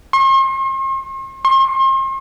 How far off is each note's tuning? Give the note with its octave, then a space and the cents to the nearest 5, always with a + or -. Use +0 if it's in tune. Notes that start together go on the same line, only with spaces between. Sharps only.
C6 +45
C6 +40